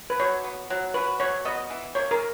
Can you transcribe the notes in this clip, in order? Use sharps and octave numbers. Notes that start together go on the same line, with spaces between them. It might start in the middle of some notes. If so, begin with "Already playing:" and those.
B4
F#3 C#5
B3
F#3
F#4 B4
F#3 C#5
B3 D#5
E3
A#3 C#5
A#4